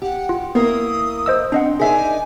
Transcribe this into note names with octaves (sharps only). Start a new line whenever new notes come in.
G4 F#5
F4
A#3 B3 E4 A#4 D#6
C5 D#5 E6
C4 D4 D#5 F#5
D4 D#4 G#4 A#4 E5 G#5